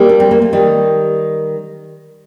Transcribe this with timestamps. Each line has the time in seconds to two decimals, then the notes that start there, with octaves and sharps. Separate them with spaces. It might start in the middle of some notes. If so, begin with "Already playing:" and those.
Already playing: G3 A#3
0.09 D4
0.20 C4
0.31 A#3
0.42 A3
0.53 D#3 G3